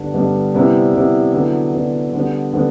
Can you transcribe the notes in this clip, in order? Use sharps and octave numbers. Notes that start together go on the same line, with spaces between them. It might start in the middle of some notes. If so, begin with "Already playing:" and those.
Already playing: G2 D3 G3 B3 D4
G2 D3 G3 B3 D4
C3 G3 B3 E4
C3 G3 B3 E4
D3 F#3 B3 E4
D3 F#3 B3 E4
D3 G3 B3
D3 G3 B3